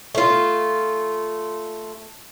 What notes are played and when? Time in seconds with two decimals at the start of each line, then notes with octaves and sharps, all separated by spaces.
0.15 A3 F4